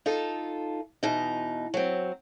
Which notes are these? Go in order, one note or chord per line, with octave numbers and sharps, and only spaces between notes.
D#4 F4 A4
E2 B2 D#4
F#3 C4